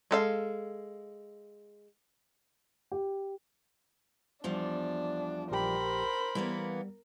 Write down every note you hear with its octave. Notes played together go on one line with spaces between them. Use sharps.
G#3 A4 F5
G4
E2 F3 G3 D4
A#1 G4 A#4 C5 G5 B5
E3 G3 A#3 B3